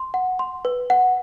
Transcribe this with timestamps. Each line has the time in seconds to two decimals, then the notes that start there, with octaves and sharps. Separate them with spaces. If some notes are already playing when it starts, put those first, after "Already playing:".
Already playing: C6
0.14 F#5
0.39 C6
0.65 B4
0.90 F#5